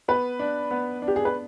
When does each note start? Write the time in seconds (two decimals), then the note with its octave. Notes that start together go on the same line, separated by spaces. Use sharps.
0.08 B3 B4
0.39 D4
0.71 B3
1.02 D4
1.08 G4
1.16 G#4
1.25 B4